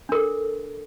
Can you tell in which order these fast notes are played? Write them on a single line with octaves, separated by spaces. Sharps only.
D4 A#4 A4